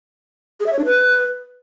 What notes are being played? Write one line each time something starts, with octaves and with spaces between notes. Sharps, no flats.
G#4
E5
C#5
D4
B4